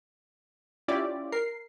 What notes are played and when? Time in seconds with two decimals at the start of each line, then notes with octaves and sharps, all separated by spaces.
0.88 C#4 E4 F4 G4 D5
1.32 A#4 C7